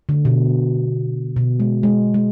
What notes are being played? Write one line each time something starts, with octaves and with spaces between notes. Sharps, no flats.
D3
B2
B2
G#3
G#3
G#3